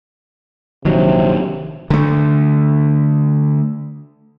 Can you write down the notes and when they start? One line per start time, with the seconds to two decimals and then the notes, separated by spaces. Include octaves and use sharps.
0.85 A#1 C3 D#3 F#3
1.90 D3 A3